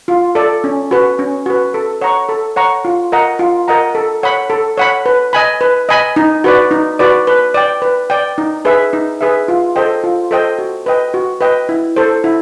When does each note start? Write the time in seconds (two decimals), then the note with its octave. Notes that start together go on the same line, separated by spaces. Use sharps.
0.08 F4
0.35 A4 D5
0.64 C#4
0.91 F#4 B4
1.19 C#4
1.46 F#4 B4
1.74 A4
2.01 C#5 F#5 A#5 C#6
2.29 A4
2.56 C#5 F#5 A#5 C#6
2.85 F4
3.12 A#4 D#5 F#5 A#5
3.39 F4
3.68 A#4 D#5 F#5 A#5
3.95 A4
4.23 C#5 F#5 B5
4.50 A4
4.78 C#5 F#5 B5
5.06 B4
5.33 D#5 G#5 B5
5.61 B4
5.89 D#5 G#5 B5
6.16 D#4
6.44 F#4 B4 D5
6.71 D#4
6.99 F#4 B4 D5
7.27 B4
7.54 D5 G5
7.82 B4
8.10 D5 G5
8.38 D#4
8.65 G#4 B4 E5
8.93 D#4
9.21 G#4 B4 E5
9.48 F4
9.76 A4 C5 D#5 G5
10.04 F4
10.31 A4 C5 D#5 G5
10.59 F#4
10.86 B4 D#5 G5
11.14 F#4
11.41 B4 D#5 G5
11.69 E4
11.96 A4 C5
12.24 E4